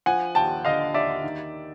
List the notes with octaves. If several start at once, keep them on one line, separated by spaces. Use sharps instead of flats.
F3 F#5 G#5
D#2 G5 A5
D3 D#5 F5
D#2 D5 E5
D#3